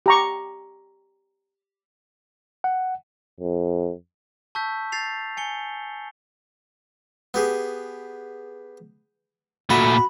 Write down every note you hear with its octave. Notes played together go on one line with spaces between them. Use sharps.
G4 A#5 C#6
F#5
F2
A5 C#6 E6 G6 B6
G6 A6 C7 F7
G#5 C#7 G7
B3 G4 G#4
A#2 A3 F#4 B5